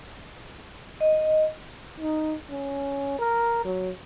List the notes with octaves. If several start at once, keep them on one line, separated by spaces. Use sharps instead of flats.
D#5
D#4
C#4
A#4
F#3